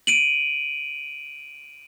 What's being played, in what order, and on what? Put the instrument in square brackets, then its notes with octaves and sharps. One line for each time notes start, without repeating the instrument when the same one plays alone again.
[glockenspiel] D7 D#7 F#7